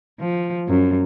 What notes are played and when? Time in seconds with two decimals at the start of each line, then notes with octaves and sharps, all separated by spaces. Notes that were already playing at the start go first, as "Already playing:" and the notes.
0.20 F3
0.68 F#2